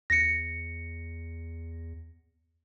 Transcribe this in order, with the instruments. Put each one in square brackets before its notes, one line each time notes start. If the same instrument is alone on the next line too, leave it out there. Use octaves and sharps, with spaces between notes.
[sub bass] E2 [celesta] A#6 C#7